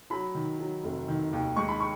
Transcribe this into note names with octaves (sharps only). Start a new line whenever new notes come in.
F#3 B5
D#3
F#3
F1
D#3
D#2
G#3 C#6
B5
C#6